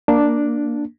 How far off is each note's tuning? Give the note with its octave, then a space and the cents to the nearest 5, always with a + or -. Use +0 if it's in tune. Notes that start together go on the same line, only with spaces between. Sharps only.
A#3 +5 D4 +0